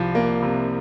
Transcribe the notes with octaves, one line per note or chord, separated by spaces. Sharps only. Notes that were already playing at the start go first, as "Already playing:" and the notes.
Already playing: C2 C3 F3
A#3
C3